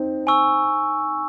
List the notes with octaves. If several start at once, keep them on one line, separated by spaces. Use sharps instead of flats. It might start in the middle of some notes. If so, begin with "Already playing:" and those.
Already playing: C4 D#4
G#5 C#6 E6